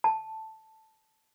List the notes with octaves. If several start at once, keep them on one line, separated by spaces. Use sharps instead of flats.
A5